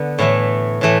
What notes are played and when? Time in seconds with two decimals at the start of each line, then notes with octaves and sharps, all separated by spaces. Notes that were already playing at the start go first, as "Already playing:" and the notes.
Already playing: D3 B3
0.19 A2 E3 A3
0.81 A2 E3 A3